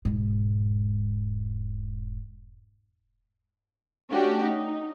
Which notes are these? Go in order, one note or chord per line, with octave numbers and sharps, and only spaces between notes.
E1 G#2
A3 C#4 D4 F#4 G4
D#4